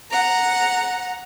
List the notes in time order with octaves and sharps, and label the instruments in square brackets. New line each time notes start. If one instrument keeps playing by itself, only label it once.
[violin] F#5 A#5